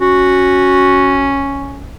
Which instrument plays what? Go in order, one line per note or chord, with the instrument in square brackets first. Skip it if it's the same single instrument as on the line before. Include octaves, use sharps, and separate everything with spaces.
[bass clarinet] C#4 [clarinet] F#4